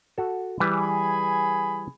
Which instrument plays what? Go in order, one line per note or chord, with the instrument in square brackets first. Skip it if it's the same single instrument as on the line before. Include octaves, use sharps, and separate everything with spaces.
[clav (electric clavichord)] F#4 A4
[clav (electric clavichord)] E3 G3 B4 [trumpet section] G#4 G#5 B5